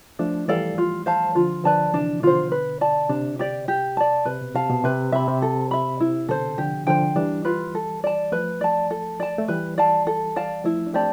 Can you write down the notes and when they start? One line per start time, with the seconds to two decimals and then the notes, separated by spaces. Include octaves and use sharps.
0.19 F3 A3 D4
0.48 E3 G3 A4 D5 F5
0.78 F4
1.06 C5 F5 A5
1.35 D3 F3 F4
1.64 D3 F3 B4 D5 A5
1.93 C3 E3 D4
2.22 B2 D3 F4 C5
2.52 B4
2.81 D5 A5
3.09 C3 D4
3.39 G4 D5
3.68 G4
3.97 D5 A5
4.25 C3 B4
4.41 B2
4.55 C3 F5 A5
4.70 B2
4.84 C3 B4
5.12 C3 E5 B5
5.27 C3
5.42 A4
5.71 E5 B5
6.00 C3 E4
6.29 B2 D3 A4 C5
6.58 D3 F3 G4
6.87 D3 F3 C5 G5
7.16 E3 G3 D4
7.45 F4 B4
7.75 A4
8.04 D5 A5
8.32 F3 A3 B4
8.61 D5 A5
8.90 A4
9.20 D5 A5
9.38 A3
9.48 E3 G3 B4
9.78 D5 F5 A5
10.07 A4
10.36 D5 F5 A5
10.64 F3 A3 E4
10.87 D4
10.93 A3 C4 G4 D5 A5